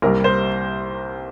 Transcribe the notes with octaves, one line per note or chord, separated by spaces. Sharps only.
C2 C3 G3 A#3 A#4
C5